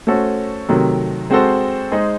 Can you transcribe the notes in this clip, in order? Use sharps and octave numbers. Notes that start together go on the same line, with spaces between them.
A3 C#4 F#4 A4 C5
C3 D#3 F#3 A3
G#3 C4 F#4 A4 C5
G#3 D#4 G#4 C5